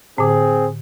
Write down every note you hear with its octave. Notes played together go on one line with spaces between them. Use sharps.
A2 D3 C4 G#4